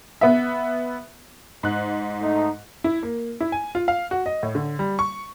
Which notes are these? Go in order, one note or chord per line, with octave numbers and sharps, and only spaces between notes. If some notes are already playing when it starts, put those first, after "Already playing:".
B3 E5
G#2 F#6
A3 D#4
E4
A#3
E4
G#5
F4
F5
F#4
D#5
A2
D3
G3
C#6